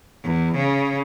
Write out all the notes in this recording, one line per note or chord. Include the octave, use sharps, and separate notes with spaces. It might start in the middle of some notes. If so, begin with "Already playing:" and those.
E2
C#3